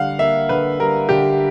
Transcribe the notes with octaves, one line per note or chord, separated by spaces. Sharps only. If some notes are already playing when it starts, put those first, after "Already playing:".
Already playing: D3 G3 F5 F#5
A#3 E5
D3 B4
G3 A#4
D3 G4